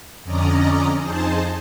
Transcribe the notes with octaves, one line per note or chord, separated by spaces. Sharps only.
F2 D3 C#4 D5 D#5 A#5
F2 D#4 G#4 C5 A5